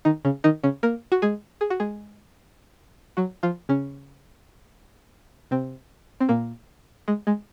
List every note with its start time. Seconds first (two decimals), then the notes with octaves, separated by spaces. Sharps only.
0.05 D#3 D#4
0.25 C#3 C#4
0.44 D#3 D#4
0.63 C#3 C#4
0.83 A#3 A#4
1.12 F#4
1.22 G#3 G#4
1.61 G#4
1.70 F#4
1.80 G#3 G#4
3.17 F#3 F#4
3.43 F3 F4
3.69 C#3 C#4
5.51 C3 C4
6.20 C4
6.29 A#2 A#3
7.08 G#3
7.27 G#3